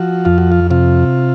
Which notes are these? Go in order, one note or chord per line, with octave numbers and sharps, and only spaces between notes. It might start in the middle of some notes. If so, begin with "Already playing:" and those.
Already playing: F3 F#4
F2 F4
F#4
F4
C3 F4